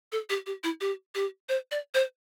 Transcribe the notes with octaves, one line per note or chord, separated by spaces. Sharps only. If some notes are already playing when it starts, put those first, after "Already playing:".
A4
G4
G4
E4
G4
G4
C5
D5
C5